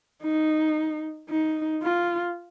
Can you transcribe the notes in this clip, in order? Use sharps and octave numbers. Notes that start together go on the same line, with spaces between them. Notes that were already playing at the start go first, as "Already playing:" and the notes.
D#4
D#4
F4